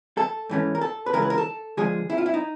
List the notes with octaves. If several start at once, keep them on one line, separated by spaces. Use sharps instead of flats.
A4
G#2 E3 A3 C#4
A#4
A4
B4
C#3 E3 G#3 A#4
B4
A#4
A4
D3 F3 G#3 G#4
E4
F4
E4
D#4